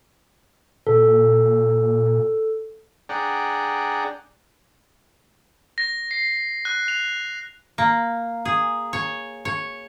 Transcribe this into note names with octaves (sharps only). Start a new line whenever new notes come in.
A#2 A4
D4 G#4 D5 F#5 G5 A#5
A#6
C7
F#6
F7
A#3
G#4
C#5
C#5